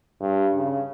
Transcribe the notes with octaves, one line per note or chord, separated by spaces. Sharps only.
G2
C#3